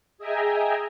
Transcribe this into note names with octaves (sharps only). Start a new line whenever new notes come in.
G#4 D#5 E5 G5 G#5 A#5